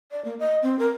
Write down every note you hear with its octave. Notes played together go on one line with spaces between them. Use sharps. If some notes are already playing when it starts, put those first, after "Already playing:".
D5
A#3
D#5
C4
A#4